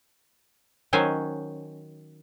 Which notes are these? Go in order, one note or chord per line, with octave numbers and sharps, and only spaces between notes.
D#3 F#3 C#4 C5 G#5